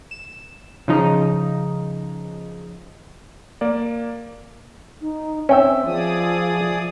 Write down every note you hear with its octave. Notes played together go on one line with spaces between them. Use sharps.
E7
C#3 F3 D#4
A#3 D5
D#4
C4 C#4 E5 G5 E6
F3 G#4 D5 D#6